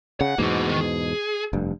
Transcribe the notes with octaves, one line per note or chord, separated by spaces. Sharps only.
C#3 F#5
E2 G#2 B2 A#3 F#4
D2 D#3
G#4
F1 G2